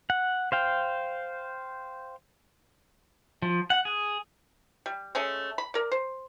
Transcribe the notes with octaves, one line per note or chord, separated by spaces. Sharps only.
F#5
C5 F5 G5
F3
F#5
G#4
G3
G#3 A3 C#4
B5
A#4 D5
C5